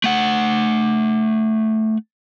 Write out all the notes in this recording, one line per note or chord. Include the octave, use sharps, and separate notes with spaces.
A3 F#5